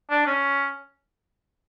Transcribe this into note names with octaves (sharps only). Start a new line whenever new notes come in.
D4
C#4